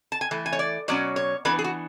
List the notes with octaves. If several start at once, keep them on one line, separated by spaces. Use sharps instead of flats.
A5
G#5
E3 A3
G#5
C#5
D5
B2 F#3 C#4 D5
C#5
E3 B3 D4 B4
G#4
F#4